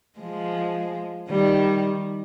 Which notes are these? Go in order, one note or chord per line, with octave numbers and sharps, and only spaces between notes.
F3 G#3
D#3 G3